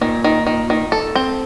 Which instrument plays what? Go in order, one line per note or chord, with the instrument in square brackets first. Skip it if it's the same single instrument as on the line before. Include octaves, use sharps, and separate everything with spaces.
[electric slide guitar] A#2 [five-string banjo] D#3
[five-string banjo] D#3
D#3
D#3
A4
C4